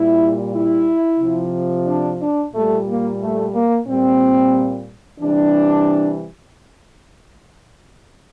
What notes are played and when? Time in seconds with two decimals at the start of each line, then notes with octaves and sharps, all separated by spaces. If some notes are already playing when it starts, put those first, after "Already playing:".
Already playing: A#2 G3 E4
0.52 E4
1.20 C3 F3
1.86 D4
2.20 D4
2.53 A#2 G3 A3
2.87 A#3
3.20 A3
3.54 A#3
3.87 A#2 G3 C4
5.20 C3 E3 G3 D4